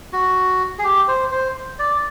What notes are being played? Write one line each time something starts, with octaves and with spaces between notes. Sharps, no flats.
F#4
G#4
G4
C5
C5
D5